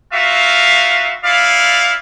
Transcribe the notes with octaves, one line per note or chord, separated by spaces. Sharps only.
D#4 F4 F#4 E5 F5
E4 F4 D5 F5